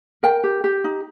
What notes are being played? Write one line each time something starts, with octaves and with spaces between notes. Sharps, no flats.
A#4 G5
G4
G4
D#4